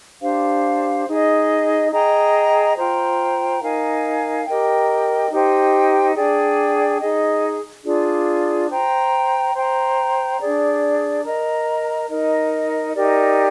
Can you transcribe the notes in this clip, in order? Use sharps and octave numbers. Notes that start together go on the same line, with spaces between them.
D4 G4 C5 F5
D#4 G#4 D#5
G#4 D#5 G5 A#5
F4 C5 G5 A#5
D#4 A#4 F5 G#5
G4 A#4 D#5 G5
D#4 G4 C5 G5
D4 G#4 D5 G5
D#4 G#4 D#5
D4 F4 G#4 D5
C5 G5 A#5
C5 G5 A#5
D4 G#4 D5
A#4 D#5 A#5
D#4 A#4 D#5
D#4 G4 A#4 D5